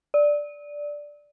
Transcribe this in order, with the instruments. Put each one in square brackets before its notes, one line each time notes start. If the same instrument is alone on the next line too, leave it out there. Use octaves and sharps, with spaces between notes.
[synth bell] D5